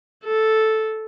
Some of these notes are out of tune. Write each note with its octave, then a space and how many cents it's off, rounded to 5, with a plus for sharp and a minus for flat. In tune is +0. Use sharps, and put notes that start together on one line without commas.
A4 -5